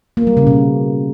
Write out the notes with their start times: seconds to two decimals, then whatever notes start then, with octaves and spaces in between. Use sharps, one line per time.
0.17 A#3
0.27 G3
0.37 C#3
0.47 B2